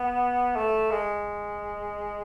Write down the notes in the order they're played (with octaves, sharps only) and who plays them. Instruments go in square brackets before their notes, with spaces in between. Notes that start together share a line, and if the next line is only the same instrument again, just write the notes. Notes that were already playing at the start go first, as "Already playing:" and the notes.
Already playing: [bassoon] B3
A3
G#3